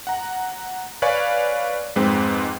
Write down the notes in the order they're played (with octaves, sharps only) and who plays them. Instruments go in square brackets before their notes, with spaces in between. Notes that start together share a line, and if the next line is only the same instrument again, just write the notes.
[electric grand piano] F#5 A#5
B4 C#5 D5 F5 G#5 C#6
F2 G#2 G#3 C4 B4 G5